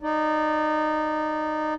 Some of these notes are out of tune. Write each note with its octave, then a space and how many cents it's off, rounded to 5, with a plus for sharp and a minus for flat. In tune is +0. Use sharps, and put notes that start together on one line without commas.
D#4 -20 D5 -10